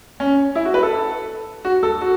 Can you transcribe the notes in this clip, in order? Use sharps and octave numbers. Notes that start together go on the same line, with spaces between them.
C#4
E4
F#4
B4
A4
F#4
A4
F#4